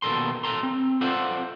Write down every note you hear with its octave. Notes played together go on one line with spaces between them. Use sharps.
D#2 B2 E3 A4 A#4 C6
A4 A#5 C6
C4
F4 A4 C5 D5 E5 F#5